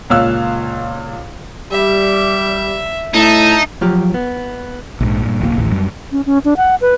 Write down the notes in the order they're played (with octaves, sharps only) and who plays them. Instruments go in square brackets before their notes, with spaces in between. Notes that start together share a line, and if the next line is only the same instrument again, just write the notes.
[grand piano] C#2 A#2 C#5 F5 E6 F#6
[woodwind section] G3 G4 [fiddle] E5
[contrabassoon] A2 [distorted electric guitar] D#4 [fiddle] E5 A5
[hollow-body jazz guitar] F3 F#3 F4 G4
B3
[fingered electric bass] A#1 G#2
G2 A#2
D1 B1 D#3 A#3
A1 D#2 A2
F#2 G3
[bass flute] C#4
C#4
D4
F#5
B4